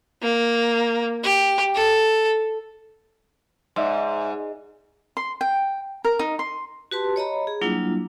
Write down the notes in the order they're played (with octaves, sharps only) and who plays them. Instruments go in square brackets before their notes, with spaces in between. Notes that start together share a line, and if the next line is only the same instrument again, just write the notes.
[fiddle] A#3
G4
A4
[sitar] G#2 [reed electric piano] D5 E5 C6
[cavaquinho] C6
G5
A#4
D#4
C6
[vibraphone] F#4 G4 B4 A5 C6
C#5 D#5 A#5 B5
G#4
F#3 G3 A#3 D4 E4 F4